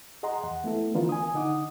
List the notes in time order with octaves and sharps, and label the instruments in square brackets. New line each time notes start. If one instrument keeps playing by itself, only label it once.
[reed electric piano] G#4 D#5 F#5 A#5 C6
E2 F#5
A3 B3 E4 A4
D3 E3 B3 D4 F4 A#4
G#5 D#6
D3 D#4 F#5 D6 D#6